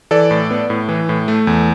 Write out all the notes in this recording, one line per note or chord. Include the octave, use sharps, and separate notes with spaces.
E3 A4 D5
A2
B3
A2
E3
A2
A3
E2